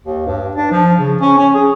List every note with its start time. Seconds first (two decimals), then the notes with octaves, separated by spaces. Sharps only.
0.05 D#2
0.26 G2
0.55 D4
0.71 F3
0.99 C#3
1.21 C#4
1.38 C#4
1.55 G#4